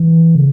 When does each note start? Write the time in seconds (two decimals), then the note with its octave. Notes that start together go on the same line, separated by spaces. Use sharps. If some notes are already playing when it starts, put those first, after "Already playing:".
Already playing: E3
0.35 C#3